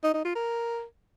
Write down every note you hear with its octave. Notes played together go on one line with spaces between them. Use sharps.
D#4
D#4
F4
A#4